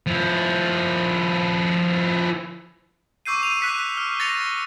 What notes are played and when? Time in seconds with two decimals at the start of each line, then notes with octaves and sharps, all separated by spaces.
0.07 F3 E4
3.26 C#6 D6 E6 G6 C7 D#7
3.43 D#7 F7
3.61 D6 F#6 B6 C#7
3.97 F6
4.20 A6 A#6 C#7 F7